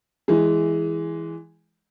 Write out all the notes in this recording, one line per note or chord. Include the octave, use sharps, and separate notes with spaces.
E3 G#3